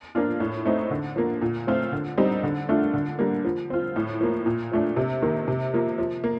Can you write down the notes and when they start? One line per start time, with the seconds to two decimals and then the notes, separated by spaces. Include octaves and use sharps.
0.15 F3 A#3 D4 F4
0.40 A2
0.65 A3 C4 D#4
0.91 D3
1.16 F3 A#3
1.41 A#2
1.67 F3 A3 C4 F4
1.92 D3
2.17 G3 C4 D#4
2.43 D3
2.69 A3 D4 F4
2.94 D3
3.19 G3 A#3
3.45 F3
3.70 C4 F4
3.96 A2
4.21 F3 A#3
4.46 A#2
4.72 F3 A3 D4
4.97 C3
5.22 D#3 A#3
5.48 C3
5.74 F3 A#3
5.98 F3
6.24 A#3